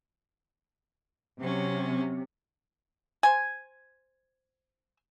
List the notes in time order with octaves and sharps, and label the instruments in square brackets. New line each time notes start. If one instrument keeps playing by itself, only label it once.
[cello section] C3 [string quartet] F#3 C#4
[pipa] C5 G#5